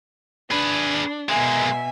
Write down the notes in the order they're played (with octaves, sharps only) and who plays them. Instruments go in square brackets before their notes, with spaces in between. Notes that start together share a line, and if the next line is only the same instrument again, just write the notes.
[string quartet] D4 [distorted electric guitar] G#4 B4
[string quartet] B2 E5 G#5 [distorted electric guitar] G#3 A#3